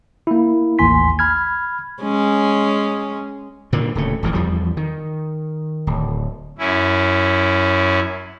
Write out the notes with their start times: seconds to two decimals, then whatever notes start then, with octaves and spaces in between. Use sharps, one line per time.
0.27 A#3 E4
0.79 A1 D#2 G#5 C6 B6
1.19 B5 F6 G#6
2.02 G#3 C#4
3.73 A#2 D3 D#3 A#3
3.95 D1 C#3 A3
4.23 D1 A1 E3 F3
4.35 E2 F3 G3
4.77 D#3
5.87 D1
6.58 F#2 C#4 E4